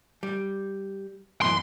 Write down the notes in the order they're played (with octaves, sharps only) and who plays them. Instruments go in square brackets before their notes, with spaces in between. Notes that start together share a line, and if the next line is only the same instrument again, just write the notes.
[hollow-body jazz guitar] G3
[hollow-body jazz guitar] F#2 B2 E3 [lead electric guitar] C6